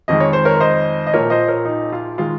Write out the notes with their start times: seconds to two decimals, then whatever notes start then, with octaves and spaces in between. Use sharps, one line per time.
0.08 F2 D#3 G#3 D#5
0.20 C#5
0.33 C5
0.45 A#4 C#5
0.60 C5 D#5
1.07 D#5
1.13 A#1 A#2 F3 A#3 A#4 C#5
1.30 C5 D#5
1.48 A#4 C#5
1.65 D#4
1.93 F4
2.18 D#3 G#3 F4